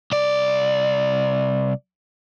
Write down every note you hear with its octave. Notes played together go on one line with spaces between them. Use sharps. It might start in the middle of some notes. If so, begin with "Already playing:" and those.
C2 D5